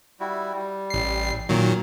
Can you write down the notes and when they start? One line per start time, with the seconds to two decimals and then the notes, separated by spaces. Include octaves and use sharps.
0.20 G3 E4 F#4
0.53 G3
0.90 A1 C7
1.49 A#2 D#3 F#3